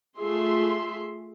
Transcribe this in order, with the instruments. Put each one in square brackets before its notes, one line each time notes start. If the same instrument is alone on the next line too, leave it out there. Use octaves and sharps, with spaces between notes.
[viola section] A3 F4 G#4 E5 C6